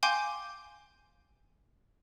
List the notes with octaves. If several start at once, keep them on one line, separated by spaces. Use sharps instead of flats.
F5 G5 G#5 C6 D6 G6